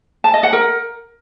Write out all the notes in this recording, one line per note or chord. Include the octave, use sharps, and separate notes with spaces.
A5
D#5
F#5
A#4